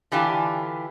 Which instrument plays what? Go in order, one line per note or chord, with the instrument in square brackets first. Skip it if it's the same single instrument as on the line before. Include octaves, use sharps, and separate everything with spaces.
[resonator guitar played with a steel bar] D3 E3 F4 G4 G#5